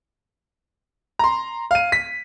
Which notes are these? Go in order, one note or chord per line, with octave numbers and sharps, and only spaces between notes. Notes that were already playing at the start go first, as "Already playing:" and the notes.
A#5 C6
F5 D#7
B6